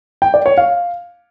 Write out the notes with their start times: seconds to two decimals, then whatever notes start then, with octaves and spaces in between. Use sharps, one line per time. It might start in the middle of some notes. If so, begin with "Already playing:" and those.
0.22 G5
0.34 D5
0.46 C#5
0.58 F5